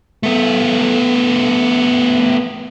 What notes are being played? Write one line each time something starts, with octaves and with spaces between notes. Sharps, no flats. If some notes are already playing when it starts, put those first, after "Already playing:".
A3 B3